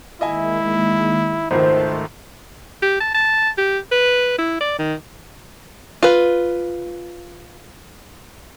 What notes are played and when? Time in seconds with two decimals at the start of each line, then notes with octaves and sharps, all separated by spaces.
0.21 D#3 G#3 A#3 E4 D#5 E5 G#5
1.51 G#1 C#2 D#3 A3 C5 F5 A5
2.82 G4
3.00 A5
3.14 A5
3.57 G4
3.92 B4
4.38 E4
4.61 D5
4.78 D#3
6.03 F4 B4